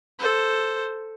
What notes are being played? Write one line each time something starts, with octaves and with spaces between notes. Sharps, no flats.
A4 C5